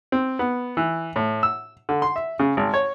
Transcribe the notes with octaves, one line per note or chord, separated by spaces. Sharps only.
C4
B3
E3
A2
E6
D3
C6
E5
C#3
G#1
C#5